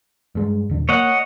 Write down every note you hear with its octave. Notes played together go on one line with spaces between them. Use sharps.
G2 G#3
D#1 D3
A#3 C#5 D#5 F#5